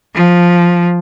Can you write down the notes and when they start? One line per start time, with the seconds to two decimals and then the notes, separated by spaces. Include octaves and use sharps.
0.15 F3